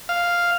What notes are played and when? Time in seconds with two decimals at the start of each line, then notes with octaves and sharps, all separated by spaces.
0.09 F5